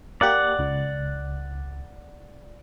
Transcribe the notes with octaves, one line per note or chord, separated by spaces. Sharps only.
A#3 G4 D5 F#5
C#2